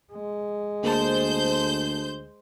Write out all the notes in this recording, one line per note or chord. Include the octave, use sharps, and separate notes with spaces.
G#3
D2 A#3 G#4 C5 A5 G6